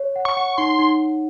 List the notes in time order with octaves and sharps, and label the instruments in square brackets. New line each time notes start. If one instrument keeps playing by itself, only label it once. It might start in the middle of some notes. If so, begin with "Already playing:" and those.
Already playing: [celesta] C#5
F#5
[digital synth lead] C#6
[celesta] F#5
[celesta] D#4 [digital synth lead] C6
[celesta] D#4